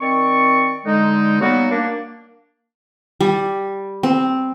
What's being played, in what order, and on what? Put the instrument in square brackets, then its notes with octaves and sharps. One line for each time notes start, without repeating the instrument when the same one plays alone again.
[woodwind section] D#3 C4 D5 C#6
D3 G#3 D#4
F#3 G3 A#3 B3 D#4 F#4
A#3 D4
[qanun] G3
C4